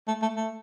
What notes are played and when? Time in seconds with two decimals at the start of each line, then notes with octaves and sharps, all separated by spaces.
0.08 A3
0.22 A3
0.36 A3